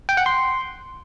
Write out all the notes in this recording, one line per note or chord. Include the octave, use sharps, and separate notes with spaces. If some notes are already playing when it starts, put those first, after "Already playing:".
G5
F#5
C6